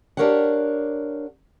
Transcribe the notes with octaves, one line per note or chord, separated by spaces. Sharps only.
D4 G4 A#4 C#5 F5 F#5